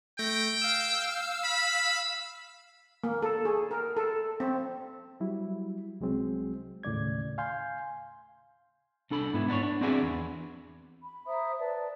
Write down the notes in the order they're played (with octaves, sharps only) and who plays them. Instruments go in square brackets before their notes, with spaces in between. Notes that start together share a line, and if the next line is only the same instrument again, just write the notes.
[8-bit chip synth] A3 A#6 [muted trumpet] G5
[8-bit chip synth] F5 E6
[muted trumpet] B5
[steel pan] A#3
A4
G#4
A#4
A4
C4
[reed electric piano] F#3 G3 E4
C2 F#3 G#3 C4
D#2 A2 C#3 D5 G#6
F5 G#5 C6 G6
[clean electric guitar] C2 D4 A4 B5
G#2 B3 E4
B3 D4 B4 C#5
D4
C4 D4 E4 F#4 G#4 B4
E2
[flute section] B5
C5 E5 A#5 D#6
B4 D5 A5